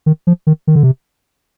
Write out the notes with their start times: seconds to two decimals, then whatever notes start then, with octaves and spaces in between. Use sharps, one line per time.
0.06 D#3
0.27 F3
0.47 D#3
0.67 D#3
0.76 D3
0.83 C3